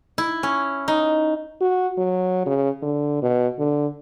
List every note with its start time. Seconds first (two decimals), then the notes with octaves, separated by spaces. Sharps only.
0.18 E4
0.43 C#4
0.88 D#4
1.61 F#4
1.98 F#3
2.46 C#3
2.82 D3
3.23 B2
3.59 D3